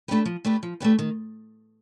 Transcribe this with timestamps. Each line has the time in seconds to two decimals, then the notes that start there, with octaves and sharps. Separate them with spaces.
0.08 A3 D4 G4 B4
0.25 F3
0.45 A3 D4 G4 B4
0.63 F3
0.80 A3 D4 G4 B4
0.99 D#3